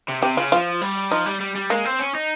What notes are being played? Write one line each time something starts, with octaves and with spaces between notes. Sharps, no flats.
C3
C3 G4
C#3 F4
F3 F4
G3
F3 D#4
G3
G3
G3
G#3 A#3
C4
C#4
D#4